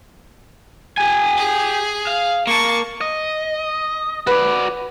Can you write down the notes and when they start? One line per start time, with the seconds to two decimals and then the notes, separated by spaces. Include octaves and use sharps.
0.98 G4 G#5
1.37 G#4
2.07 F5
2.47 A#3 A5 C#6
3.01 D#5
4.27 F#4 B4 D5